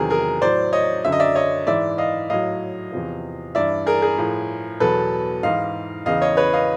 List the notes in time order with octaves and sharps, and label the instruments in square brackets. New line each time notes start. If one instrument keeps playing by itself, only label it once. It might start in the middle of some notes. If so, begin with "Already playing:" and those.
Already playing: [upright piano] E2 C3 D#3 F#3 G#4 A#4
G#4 A#4
A2 F#3 C5 D5
C#5 D#5
F#2 D3 F#3 E5
D#5
D5 E5
C#5 D#5
G#2 E3 D5 E5
D#5 F5
A2 F#3 D#5 F5
E2 C3 F3
G2 E3 D5 E5
G#4 A#4
G#4 A#4
A2 F3
E2 B2 F#3 A4 B4
G#2 E3 D#5 F5
E2 C#3 E3 D#5 F5
C#5 D#5
B4 C#5
D#5 F5